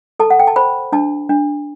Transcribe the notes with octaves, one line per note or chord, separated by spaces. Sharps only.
A4 A5
F#5
G5
A5
C5 B5
D4 A5
D4